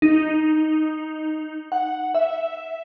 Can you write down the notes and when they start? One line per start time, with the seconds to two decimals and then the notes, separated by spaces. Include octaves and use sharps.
0.02 D#4
1.72 F#5
2.15 E5